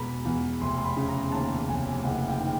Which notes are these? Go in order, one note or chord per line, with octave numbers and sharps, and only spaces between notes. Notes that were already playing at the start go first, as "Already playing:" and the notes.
Already playing: E2 B2 G#3 A#5 B5
E2
F1 C6
C6
B5
C#3
A#5
D#2 A5
F1 G#5
F#1 F#5
G5
D#3